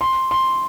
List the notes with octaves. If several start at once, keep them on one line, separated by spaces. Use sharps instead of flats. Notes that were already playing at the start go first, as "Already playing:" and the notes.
C6
C6